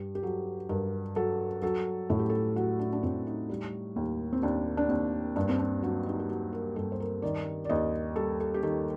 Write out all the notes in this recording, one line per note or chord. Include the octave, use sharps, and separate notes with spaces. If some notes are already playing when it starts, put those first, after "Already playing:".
Already playing: G2 G4
G4
F#3 A4
G2 A#4
F#3 A4
F#3 A4
A2 A4
G4
A4
F#3 F#4
D4
D4
A2 C4
D#4
G3
D#2
C4
D#2 D4
D4
D#2 C4
G2 D4
C4
D4
F#3 D4
D#4
G4
F#3 F#4
A#4
G2 A4
C5
A#4
D#3 D5
D5
D#2 D#5
G3 A4
A4
G4
D#3 A4